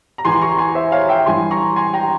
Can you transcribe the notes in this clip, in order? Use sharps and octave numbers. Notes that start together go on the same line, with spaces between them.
A#5
E2 E3 G#5 C6
A#5 C#6
G#5 C6
C5 E5
C#5 F5
E5 G5
G2 E3 G#5 C6
A#5 C#6
G#5 C6
G5 A#5